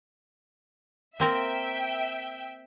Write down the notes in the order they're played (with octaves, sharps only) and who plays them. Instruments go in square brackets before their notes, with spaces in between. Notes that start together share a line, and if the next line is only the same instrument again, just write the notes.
[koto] A#3 C4 A#4 [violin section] E5 G5